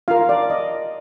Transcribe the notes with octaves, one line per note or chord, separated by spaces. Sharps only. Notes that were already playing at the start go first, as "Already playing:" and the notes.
F4 A#4 F5
D5
D#5